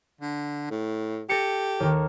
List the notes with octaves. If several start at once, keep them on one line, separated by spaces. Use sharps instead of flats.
D3
A2
G4 A4 A#6 C#7
D#2 D#3